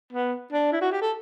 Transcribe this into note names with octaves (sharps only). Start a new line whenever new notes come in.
B3
D4
E4
F#4
G4
A4